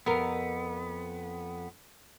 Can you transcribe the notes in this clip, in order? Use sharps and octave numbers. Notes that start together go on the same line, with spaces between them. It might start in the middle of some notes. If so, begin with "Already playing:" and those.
F2 B3 A#4